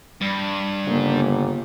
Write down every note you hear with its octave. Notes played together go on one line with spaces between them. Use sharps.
G2
G1 C#3 A#3